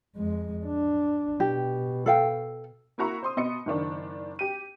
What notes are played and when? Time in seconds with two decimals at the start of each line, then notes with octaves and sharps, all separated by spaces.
0.17 F2 G#3
0.66 D4
1.40 B2 G4
2.06 A4 F5 G5
2.98 A#3 E4 F#4 A#5 C#6
3.23 C5 C6 D#6
3.37 B2 B3 D#5 C6 D#6 C#7
3.66 F#1 D#3 D4
4.39 G4 D#7